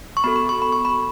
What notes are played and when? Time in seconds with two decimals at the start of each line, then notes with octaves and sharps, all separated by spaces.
0.17 C#6
0.24 B3 F#4 A4 B5
0.36 B5
0.49 C#6
0.62 B5
0.72 C#6
0.85 B5